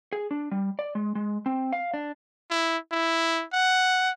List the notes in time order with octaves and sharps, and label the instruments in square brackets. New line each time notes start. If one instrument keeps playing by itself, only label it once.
[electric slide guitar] G#4
D4
G3
D5
G#3
G#3
C4
F5
D4
[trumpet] E4
E4
F#5